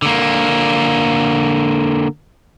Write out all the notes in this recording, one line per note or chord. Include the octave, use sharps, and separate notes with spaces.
D3 A#3